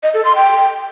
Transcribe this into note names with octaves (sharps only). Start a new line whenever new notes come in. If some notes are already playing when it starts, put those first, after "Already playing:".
D#5
A4
C6
G5